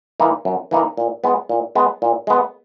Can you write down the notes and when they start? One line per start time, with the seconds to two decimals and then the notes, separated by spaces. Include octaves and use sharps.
0.20 E3 A#3 D#4
0.45 F#2
0.71 E3 A#3 D#4
0.97 A#2
1.24 G#3 B3
1.49 A#2
1.75 G#3 B3
2.02 A#2
2.27 G#3 B3